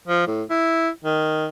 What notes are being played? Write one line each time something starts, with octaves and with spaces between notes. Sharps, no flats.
F3
A2
E4
D#3